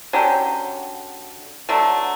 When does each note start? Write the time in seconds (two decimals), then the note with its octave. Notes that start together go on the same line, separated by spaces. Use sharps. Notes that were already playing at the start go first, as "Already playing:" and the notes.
0.13 D3 F#3 C#4 G4
1.69 D3 F#3 A3